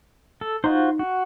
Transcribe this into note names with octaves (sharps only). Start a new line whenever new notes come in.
A4
D#4 F4 F#4 C5
F#4